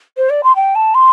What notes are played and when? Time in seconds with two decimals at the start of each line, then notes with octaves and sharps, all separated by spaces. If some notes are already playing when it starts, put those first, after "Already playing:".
0.17 C5
0.30 D5
0.43 C6
0.56 G5
0.75 A5
0.94 C6